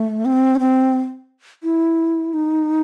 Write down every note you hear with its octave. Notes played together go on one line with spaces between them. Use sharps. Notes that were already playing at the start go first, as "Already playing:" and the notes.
Already playing: A3
C4
C#4
C4
E4
D#4